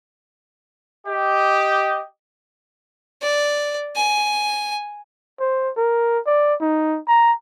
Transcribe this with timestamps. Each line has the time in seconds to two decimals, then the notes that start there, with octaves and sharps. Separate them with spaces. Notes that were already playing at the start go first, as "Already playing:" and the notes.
1.07 G4 D#5
3.22 D5
3.95 G#5
5.40 C5
5.77 A#4
6.27 D5
6.61 D#4
7.08 A#5